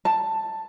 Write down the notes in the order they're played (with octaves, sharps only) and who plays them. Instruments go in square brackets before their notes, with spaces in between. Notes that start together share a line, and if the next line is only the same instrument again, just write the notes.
[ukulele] A5